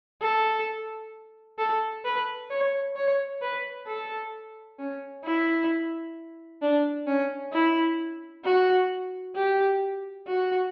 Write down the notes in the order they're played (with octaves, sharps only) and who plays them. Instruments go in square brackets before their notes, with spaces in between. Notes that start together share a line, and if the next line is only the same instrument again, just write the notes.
[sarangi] A4
A4
B4
C#5
C#5
B4
A4
C#4
E4
D4
C#4
E4
F#4
G4
F#4